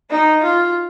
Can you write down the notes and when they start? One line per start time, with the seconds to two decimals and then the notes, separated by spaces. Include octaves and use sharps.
0.10 D#4
0.43 F4